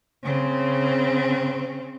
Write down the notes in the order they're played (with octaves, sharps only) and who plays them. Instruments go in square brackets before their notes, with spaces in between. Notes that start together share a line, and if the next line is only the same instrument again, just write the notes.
[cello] C#3 C4